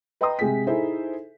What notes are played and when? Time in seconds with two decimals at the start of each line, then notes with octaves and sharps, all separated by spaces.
0.21 B4 D#5 G5 A#5 C6 D#6
0.39 C3 G#3 G#4 G5 B6
0.67 D#4 E4 G#4 A4 C5 E5